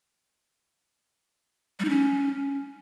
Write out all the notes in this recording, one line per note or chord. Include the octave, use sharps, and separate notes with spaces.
G3
D#4
C#4